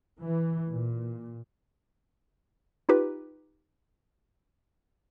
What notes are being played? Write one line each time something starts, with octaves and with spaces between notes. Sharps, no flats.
E3
A#2
D#4 F4 G4 B4